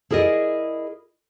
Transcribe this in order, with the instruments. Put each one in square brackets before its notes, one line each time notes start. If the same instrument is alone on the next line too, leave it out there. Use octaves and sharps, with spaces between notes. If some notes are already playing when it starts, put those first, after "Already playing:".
[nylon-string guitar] E4 G#4 A#4 D5 D#5